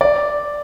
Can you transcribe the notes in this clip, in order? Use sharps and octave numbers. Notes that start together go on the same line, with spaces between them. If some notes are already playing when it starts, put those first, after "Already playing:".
D5